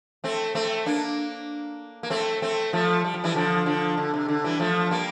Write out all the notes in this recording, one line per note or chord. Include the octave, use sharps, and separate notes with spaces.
A3 C4
A3 C4
A#3 D4
A#3
A3 C4
A3 C4
F3 A3
G3
F3
E3 G3
D3 F3
D3 F3
D3
C3
D3
E3 G3
F3 A3
G3 A#3